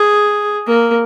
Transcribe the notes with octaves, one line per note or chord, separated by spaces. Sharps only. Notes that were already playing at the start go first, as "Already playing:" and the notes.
Already playing: G#4
A#3